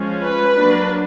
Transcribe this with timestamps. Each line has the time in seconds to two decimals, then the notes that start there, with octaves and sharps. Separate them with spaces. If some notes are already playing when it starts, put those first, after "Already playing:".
Already playing: F3 G#3 C#4
0.22 B4
0.56 F#3 A#3 D4